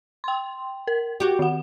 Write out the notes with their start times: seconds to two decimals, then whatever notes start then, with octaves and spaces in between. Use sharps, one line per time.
0.24 G5 C6
0.87 A#4
1.20 F#4 G4
1.39 D#3 F#5